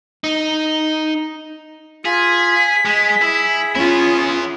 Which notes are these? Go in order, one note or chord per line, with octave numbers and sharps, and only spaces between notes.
D#4
F4 G#4 B6
G#3 G#4
E4
B3 C#4 E4 F4